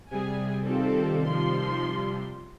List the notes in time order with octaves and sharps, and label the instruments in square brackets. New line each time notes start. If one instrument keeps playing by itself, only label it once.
[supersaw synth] C3 G3 [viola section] G#4 G#5
[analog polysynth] D#3 F4 [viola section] C4 G4 A4
[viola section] F3 C6